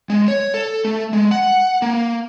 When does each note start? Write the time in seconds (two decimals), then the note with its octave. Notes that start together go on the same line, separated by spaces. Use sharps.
0.10 G#3
0.28 C#5
0.54 A4
0.85 A3
1.13 G#3
1.31 F#5
1.82 A#3